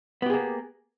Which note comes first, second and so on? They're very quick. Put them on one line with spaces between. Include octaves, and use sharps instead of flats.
B3 G4 G#4 A#3